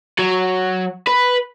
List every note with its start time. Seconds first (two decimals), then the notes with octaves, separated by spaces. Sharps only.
0.19 F#3
1.07 B4